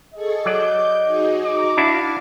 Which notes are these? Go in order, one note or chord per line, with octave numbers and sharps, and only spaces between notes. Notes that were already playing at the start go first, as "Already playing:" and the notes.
G#4 A4 D#5 C#6
F#3 D5 D6 G6
D#4 F#4 G#4
F#4 A#5 D6
D4 E4 F#4 F5